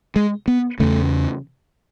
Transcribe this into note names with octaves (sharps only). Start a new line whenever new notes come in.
G#3
B3
E2 C#3 A3